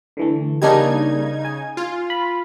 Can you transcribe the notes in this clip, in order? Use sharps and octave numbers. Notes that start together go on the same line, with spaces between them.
D3 E3 A3
C#3 G3 A#3 D4 D#4 G#6
G#5
F4
B5